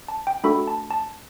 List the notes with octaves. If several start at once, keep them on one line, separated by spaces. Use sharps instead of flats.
A5
G5
A3 D4 F#4 A4 B5
A5
A5